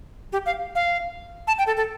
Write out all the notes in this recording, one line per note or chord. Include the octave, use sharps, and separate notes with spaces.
G4
F5
F5
A5
G5
A4
A4